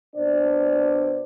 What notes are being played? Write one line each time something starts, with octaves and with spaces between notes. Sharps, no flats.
B2 D4 C5 D5